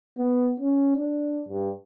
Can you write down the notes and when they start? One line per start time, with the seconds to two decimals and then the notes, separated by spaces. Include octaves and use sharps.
0.18 B3
0.60 C#4
0.97 D4
1.49 G2